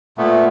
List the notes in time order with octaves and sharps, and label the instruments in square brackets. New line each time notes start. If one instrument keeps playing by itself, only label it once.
[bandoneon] A#2 A3 B3